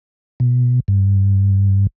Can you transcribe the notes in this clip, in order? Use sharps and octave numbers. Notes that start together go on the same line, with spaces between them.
B2
G2